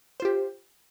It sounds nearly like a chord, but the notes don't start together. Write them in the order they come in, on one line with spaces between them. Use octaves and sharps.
C5 F4 G4